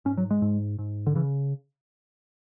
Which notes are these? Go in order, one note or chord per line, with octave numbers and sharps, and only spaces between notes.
G#2 C#4
F#3
G#3
G#2
G#2
D3
C#3 E3